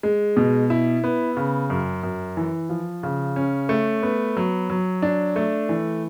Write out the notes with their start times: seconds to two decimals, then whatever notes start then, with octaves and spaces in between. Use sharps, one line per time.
0.03 G#3
0.37 B2
0.70 E4
1.04 B3
1.37 C#3
1.70 F#2
2.03 F#2
2.37 E3
2.69 F3
3.03 C#3
3.36 C#4
3.69 A3
4.03 B3
4.37 F#3
4.70 F#3
5.02 D4
5.36 A3
5.69 E3